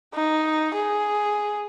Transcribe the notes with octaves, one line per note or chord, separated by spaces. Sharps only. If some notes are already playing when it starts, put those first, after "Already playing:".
D#4
G#4